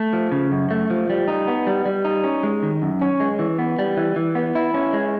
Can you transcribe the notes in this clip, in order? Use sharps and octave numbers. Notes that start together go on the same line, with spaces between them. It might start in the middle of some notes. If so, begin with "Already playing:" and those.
Already playing: A3
F3
C#3
F#2
A3
F3
G3
D#4
B3
G3
G3
D#4
C#4
G#3
D#3
F#2
C#4
G#3
E3
B3
G3
E3
E3
B3
E4
C#4
G#3